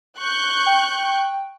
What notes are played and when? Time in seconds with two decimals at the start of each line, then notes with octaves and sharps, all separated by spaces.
0.19 C#6 F#6 G6
0.66 G5